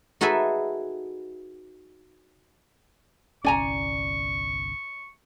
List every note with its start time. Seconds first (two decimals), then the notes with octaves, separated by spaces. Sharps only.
0.21 D#4 F#4 G#4 A4 B4 E5
3.45 G1 C2 C#4 D5 G#5 A#5 C#6